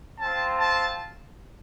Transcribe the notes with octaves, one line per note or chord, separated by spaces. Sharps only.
C4 F4 A5
A5